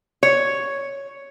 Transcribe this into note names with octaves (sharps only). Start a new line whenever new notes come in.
C#5